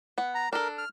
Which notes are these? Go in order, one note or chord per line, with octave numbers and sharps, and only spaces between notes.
B3 F#5
A#5
D4 A4 A#4
F6